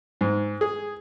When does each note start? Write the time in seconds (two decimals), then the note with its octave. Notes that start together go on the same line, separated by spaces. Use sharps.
0.21 G#2
0.61 G#4